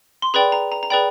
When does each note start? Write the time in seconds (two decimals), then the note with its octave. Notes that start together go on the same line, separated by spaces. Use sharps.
0.22 C6
0.34 G#4 B4 D5 G5 B5
0.52 A#5
0.72 A#5
0.83 A#5
0.90 G#4 B4 D5 G5 B5